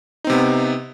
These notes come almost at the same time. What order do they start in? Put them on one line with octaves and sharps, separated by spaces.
D#4 C4 C3 B3